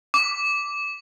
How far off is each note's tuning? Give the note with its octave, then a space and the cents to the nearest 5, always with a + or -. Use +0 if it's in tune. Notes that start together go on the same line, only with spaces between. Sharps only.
D6 -10